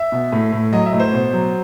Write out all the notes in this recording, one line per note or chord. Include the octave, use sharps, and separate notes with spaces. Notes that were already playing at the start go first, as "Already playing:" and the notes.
Already playing: E5
B2
A2
A2
F#3 D#5
E5
A2
C5
B2
F#3